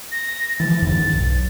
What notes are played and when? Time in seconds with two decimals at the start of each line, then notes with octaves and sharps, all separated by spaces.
0.12 A#6
0.60 E3 F3 A6
0.82 E2 G2 D#3
1.13 B1